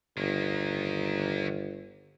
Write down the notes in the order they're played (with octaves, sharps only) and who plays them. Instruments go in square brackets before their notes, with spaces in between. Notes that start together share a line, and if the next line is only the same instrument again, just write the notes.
[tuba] G1 [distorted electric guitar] D#3 A#3